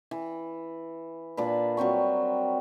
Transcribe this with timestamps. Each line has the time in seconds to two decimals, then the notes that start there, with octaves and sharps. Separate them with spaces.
0.11 E3
1.37 A#2 D4 B4
1.77 F#3 G3 C4 C#6